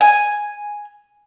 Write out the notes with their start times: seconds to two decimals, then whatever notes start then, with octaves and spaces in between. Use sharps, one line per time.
0.01 G#5